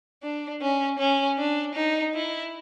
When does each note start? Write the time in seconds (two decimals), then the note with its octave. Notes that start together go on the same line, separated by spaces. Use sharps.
0.23 D4
0.62 C#4
0.99 C#4
1.38 D4
1.75 D#4
2.14 E4